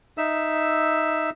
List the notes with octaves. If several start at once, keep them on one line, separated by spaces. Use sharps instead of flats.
D#4 E5 E6